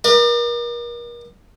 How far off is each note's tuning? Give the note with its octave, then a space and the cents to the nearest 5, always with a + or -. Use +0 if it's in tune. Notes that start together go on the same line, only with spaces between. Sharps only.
A#4 +35 D5 +45